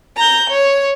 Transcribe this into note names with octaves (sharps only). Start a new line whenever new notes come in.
A#5 G6
C#5